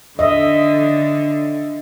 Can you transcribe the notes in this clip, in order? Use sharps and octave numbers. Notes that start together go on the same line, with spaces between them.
D3 D#5 E5